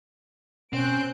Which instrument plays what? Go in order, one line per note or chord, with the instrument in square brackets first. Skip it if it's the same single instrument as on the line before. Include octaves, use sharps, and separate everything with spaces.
[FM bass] B2 [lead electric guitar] C4 [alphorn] C#4 [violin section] F#6 G6 D7